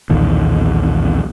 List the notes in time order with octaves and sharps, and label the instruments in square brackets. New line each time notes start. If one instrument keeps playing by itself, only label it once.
[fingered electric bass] B1 E2 A#2 D#3